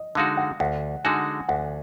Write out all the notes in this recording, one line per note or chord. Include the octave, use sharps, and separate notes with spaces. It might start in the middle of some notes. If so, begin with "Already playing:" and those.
Already playing: D#5
D3 G#3 D#4 F#4 F5
F#5
D2 F#5
D3 G#3 D#4 F#4 G#5
D2 F#5